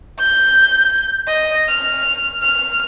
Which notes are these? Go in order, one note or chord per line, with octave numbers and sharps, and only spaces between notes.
G6
D#5
F6
F6